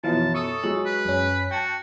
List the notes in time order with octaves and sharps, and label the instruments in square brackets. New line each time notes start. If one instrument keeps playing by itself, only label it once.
[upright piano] F#2 B2 [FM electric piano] E3 F3 F5 [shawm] A5
[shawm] A4 [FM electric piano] C#6 D#6
[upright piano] F#3 G#3 F#7
[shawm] B4
[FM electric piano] F#2 C#4
[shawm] F#4 [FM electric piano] G5 A5 [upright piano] G6